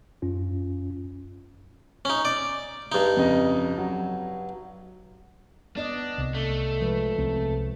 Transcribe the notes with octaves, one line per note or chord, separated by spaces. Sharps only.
F#2 C#4 F4
C#4 D#4
D5
G2 D#4
F2 C#3 D#5
F#3
B3 D4 D5 D#5
C2
A3
F3 G#3 B4
C2 C3